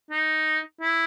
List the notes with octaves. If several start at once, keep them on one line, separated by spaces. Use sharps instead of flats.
D#4
E4